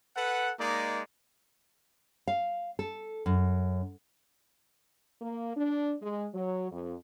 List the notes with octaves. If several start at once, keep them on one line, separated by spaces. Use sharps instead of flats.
A4 B4 F#5
G#3 A#3 D#4 D5
F5
A4
F#2
A#3
D4
G#3
F#3
F2